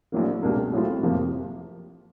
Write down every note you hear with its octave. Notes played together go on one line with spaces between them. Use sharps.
A#1 A2 F#3 A#3
C#2 B2 G3 A#3 D4
A2 F#3 A3 C4 F4
F#1 F2 C3 F3 A#3